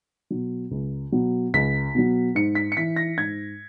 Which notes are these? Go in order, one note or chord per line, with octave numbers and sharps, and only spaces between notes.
B2 F#3
C#2
B2 F#3
C#2 B6
B2 F#3
G#2 C#7
B6
C#7
E3 B6
A#6
G#2 G#6